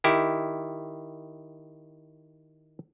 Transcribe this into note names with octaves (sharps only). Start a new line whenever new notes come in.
D#3 E4 G4